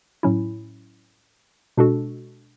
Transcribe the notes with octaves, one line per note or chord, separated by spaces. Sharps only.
A2 F#3 C#4 E4
B2 G#3 D4 F#4 A4